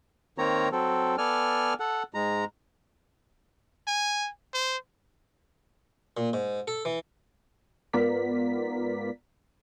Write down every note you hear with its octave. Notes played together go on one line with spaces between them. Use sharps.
D#3 A#3 C4 C#5 A#5
F#3 C4 A4
B3 A4 D5 G#5 F6
A4 F#5
G#2 G#3 A#5
G#5
C5
A#2
G#2
A4
E3
G#2 B3 F4 A#4 D5 B6